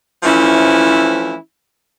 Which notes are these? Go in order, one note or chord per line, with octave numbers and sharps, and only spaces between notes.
E3 F3 A3 C4 C#4 E4